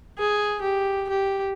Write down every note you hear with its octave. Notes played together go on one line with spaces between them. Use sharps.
G#4
G4
G4